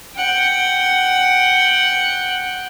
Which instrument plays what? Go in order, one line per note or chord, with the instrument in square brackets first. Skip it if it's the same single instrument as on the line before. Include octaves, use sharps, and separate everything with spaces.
[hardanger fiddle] F#5 G5